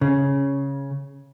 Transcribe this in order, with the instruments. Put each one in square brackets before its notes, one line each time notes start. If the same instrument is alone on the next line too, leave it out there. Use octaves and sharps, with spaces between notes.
[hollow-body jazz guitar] C#3